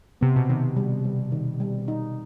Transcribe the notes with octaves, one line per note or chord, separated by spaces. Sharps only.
C3 B3
B2
C3 D#3
G3
G3
D#3
G3
D#4